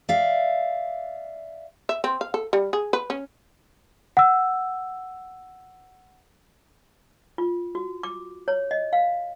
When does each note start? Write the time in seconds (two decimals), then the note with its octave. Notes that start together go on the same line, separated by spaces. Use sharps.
0.09 D5 E5 F5
1.89 E5
2.04 C4
2.21 F5
2.34 A4
2.53 G3
2.73 G#4
2.93 B4
3.10 C#4
4.17 F#5 E6
7.38 F4
7.75 F#4
8.03 D6
8.48 C#5
8.71 D#5
8.93 F5